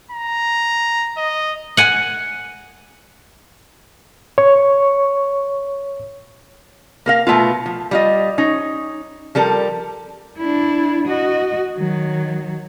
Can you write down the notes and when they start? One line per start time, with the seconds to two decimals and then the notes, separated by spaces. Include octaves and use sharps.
0.11 A#5
1.17 D#5
1.77 F#5 G#5
4.38 C#5 C#6
7.06 A#3 A#4 F5
7.27 B2 A3 B3 F4
7.66 F3
7.91 G3 F4 D#5
8.38 C#4 D#4
9.35 F3 G3 A4 A#4
10.38 D4 E4
11.07 F#4 D#5
11.76 D#3 F#3